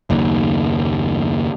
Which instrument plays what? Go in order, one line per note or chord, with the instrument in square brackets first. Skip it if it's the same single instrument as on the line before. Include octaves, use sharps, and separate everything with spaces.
[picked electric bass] F#1 D#2